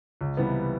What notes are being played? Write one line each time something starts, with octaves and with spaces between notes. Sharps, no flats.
C#2
C3 E3 G3 B3